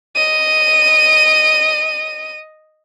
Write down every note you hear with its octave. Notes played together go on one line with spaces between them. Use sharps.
D#5 D#7